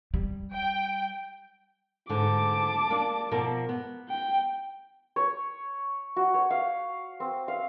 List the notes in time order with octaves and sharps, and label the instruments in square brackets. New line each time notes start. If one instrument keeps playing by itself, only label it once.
[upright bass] G3
[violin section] G5
[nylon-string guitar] G#2 D3 [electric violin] A5 D6
[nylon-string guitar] A#3 D4
B2 F3 A#4
B3
[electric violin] G5
[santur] C#5
F#4
C#5
F5
C4
F5